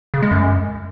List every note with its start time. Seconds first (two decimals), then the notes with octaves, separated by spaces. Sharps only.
0.14 C#3
0.22 G#3
0.31 F#2